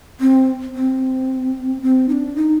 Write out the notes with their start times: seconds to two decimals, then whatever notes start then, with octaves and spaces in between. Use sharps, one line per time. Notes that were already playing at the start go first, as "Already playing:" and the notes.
0.21 C4
0.75 C4
1.82 C4
2.09 D#4
2.12 D4
2.36 D#4